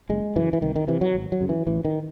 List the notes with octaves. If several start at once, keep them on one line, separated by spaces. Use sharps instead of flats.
F#1 G#3
F#2 C#3 E3
E3
C2 D#3
D#3
C3 E3
F#3
G#1
F#3
F#2 C#3
E3
A1 E3
D#3